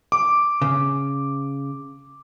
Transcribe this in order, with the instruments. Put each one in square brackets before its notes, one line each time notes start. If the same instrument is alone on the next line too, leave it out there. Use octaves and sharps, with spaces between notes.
[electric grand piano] D6
[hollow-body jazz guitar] C#3